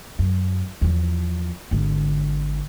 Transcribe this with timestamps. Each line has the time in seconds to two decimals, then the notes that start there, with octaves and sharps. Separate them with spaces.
0.19 F#2
0.81 E2 F3
1.71 G#1 D3